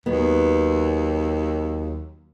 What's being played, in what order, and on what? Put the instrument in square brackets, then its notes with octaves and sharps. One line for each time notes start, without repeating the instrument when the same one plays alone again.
[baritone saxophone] D#2 [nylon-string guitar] F#3 B3